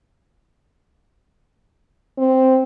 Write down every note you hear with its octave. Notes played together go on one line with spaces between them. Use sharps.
C4